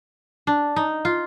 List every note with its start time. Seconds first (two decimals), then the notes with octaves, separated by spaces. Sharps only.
0.47 D4
0.76 D#4
1.05 F4